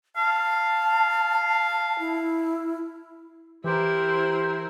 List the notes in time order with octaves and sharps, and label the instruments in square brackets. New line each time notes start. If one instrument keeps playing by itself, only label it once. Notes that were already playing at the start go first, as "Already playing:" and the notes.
[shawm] F5 [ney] A5
[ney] E4
[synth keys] E3 [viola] E4 A#4 [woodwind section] G4 C5